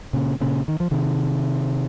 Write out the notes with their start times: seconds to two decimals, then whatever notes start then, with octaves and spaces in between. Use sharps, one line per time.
0.13 A#2 C#3
0.41 A#2 C#3
0.68 D#3
0.80 F3
0.91 C3 D#3